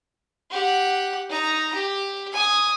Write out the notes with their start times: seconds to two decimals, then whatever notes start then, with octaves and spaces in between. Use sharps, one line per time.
0.51 G4 F#5
1.29 D#4 A#5
1.75 G4
2.33 G#5 D#6